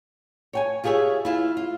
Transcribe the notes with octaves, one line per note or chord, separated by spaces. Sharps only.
C#5 G5 G#5
F4 G4 G#4 C#5 E5
E4 F4 E5
F4